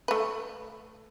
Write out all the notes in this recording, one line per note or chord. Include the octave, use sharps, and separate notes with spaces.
A3 B4